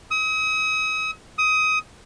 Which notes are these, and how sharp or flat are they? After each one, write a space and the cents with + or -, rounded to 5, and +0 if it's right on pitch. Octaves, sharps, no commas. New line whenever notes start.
D#6 +40
D#6 +20